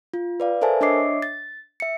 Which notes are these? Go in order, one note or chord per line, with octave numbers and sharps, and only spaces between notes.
F4
B4 D5 F5
A4 A#4 C5 E5 G#5 A5
D4 C#5 D#5 E5 D6 C7
A6
E5 C#7